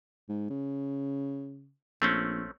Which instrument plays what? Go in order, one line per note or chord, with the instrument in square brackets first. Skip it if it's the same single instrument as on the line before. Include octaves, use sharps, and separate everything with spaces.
[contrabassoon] G#2
C#3
[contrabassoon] A#1 [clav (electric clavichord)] A3 C4 C#4